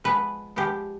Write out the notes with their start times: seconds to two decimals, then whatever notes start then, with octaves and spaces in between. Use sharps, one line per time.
0.04 F3 G#3 B3 B4
0.56 F3 G#3 B3 G4